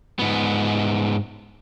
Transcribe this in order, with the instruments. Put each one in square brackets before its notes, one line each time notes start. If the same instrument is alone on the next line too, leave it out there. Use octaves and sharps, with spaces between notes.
[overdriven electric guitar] G#2 B3